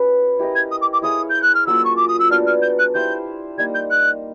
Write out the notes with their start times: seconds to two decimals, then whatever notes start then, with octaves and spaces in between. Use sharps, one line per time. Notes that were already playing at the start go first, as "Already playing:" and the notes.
Already playing: C#4 F#4 B4
0.39 E4 G4 A#4 D#5
0.55 G#6
0.71 D#6
0.81 D6
0.92 D6
1.02 E4 G#4 C#5 F5 D#6
1.29 G6
1.42 F#6
1.54 F6
1.66 F#3 A#3 C#4 F4 E6
1.84 C#6
1.96 D6
2.08 D#6
2.19 E6
2.30 B3 D4 F#4 F6
2.46 F6
2.62 G6
2.78 F#6
2.94 E4 G4 C5 F5 G6
3.58 G3 A#3 D#4 G#6
3.74 G6
3.90 F#6